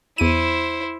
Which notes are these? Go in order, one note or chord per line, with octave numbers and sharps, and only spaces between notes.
E2 E4 C5 D#7